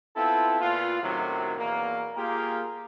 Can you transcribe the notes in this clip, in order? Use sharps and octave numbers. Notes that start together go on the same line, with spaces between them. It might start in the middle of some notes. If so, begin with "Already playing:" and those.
B3 C4 E4 F4 A4
A#2 B3 F4
F#2 A2 C3 D#3 F#3
E2 B2 A#3
A#3 F4 G4 G#4 A#4